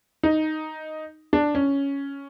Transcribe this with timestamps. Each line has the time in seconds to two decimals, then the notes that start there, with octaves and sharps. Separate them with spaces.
0.23 D#4
1.33 D4
1.55 C#4